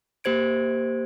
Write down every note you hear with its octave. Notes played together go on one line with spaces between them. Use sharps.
A#3 G4 C5 G#6 D7